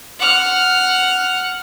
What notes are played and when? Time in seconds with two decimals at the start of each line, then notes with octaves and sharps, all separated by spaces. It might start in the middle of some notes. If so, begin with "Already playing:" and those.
0.19 F#5 F6